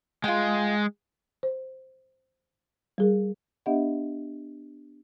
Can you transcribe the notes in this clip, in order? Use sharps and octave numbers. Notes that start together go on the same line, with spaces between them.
G#3 F4 G5
C5
G3 G#4 A#4
B3 D4 G4 D#5 E5 F#5